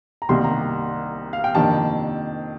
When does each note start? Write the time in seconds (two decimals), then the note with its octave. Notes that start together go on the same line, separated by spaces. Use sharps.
0.22 A#5
0.29 C2 C3 D#3 A#3 C6
0.44 A#5
1.33 F5
1.44 G5
1.54 F2 C3 D#3 A#3 D4 A5